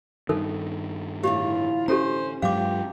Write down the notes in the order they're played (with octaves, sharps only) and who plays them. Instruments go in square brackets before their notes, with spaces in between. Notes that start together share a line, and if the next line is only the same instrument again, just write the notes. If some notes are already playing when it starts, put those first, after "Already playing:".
[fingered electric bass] G2 D#3 [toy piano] D#4 A4 A#4
[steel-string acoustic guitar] A2 D3 E3 [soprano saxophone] F4 [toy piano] G4
[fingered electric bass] C#4 [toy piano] G4 A4 A#5 [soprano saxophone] C5
[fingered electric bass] G2 F#3 G#3 [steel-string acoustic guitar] B3 F4 [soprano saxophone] G4 [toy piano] F5 D6